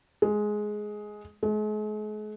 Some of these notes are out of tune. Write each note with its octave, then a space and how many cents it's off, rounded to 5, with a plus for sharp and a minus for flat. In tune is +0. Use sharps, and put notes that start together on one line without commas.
G#3 +10
G#3 +40